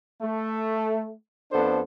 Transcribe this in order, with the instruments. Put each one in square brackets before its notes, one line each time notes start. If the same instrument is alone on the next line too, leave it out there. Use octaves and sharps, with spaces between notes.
[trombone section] A3
F2 B3 D4 A4 C5